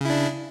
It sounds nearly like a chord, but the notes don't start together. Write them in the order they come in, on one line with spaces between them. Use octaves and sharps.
C#3 E4 D4